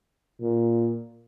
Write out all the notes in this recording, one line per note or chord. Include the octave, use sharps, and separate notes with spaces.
A#2